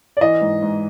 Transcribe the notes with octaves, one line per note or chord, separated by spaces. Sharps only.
D5
E3 D#5
G#2
G#2